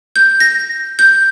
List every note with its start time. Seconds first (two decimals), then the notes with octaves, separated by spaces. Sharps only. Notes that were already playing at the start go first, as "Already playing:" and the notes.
0.16 G6
0.40 A#6
0.99 G6